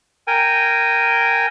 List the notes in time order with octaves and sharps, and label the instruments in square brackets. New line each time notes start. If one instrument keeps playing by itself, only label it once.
[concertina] A#4 G5 G#5